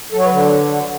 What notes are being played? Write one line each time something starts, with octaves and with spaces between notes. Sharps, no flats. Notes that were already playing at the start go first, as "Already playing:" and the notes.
F#3 A4
C#5
B4
D3